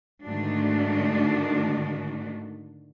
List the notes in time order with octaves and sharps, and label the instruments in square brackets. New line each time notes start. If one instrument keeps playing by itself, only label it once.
[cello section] G#2 D3 D#3 A3 D4 F#4